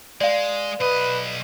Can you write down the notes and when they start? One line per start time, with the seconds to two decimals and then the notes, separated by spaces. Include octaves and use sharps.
0.21 G#3 D5 F5
0.80 B1 B4 D#5